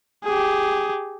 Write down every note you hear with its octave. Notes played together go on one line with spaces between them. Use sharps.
G4 G#4